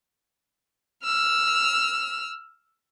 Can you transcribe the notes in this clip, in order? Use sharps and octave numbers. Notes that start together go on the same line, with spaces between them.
E6 F6